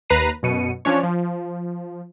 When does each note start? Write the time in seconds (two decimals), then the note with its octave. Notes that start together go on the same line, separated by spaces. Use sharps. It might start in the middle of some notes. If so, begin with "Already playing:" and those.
0.10 D#2 B4 A#5 C7 D#7
0.43 F#2 B2 C#7 D#7
0.85 F3 C#4 D4 C#5
1.03 F3